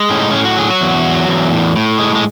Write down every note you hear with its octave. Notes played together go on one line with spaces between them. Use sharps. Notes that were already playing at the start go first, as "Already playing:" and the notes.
Already playing: G#3
A2 C#4
D#4
A2 C#4
F#4
F#3 G#4
F#4
E2
F#3
E2
A2
A2
G#3
G#3